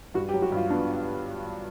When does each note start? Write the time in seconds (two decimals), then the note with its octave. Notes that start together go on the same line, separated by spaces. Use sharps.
0.14 G2 F#4
0.29 G4
0.34 F#3
0.42 F#4
0.52 G2 F4
0.70 B3 D4